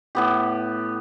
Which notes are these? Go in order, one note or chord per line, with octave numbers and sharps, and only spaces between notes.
A2 B3 G4